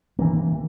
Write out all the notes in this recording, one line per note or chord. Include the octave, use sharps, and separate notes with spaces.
D#3 E3 A#3